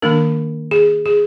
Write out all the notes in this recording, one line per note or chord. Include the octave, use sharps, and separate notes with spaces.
D#3 A#3 D4 A#4
G#4
G#4